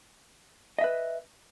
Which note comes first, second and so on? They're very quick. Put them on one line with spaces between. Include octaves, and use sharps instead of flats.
D#5 E5 B4